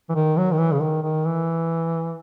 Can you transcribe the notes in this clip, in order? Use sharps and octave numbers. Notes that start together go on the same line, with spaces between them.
E3
D#3
F#3
D#3
E3
C#3
D#3
D#3
E3